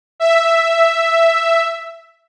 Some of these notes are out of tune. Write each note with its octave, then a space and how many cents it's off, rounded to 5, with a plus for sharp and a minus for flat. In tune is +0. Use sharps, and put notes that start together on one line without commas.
E5 +5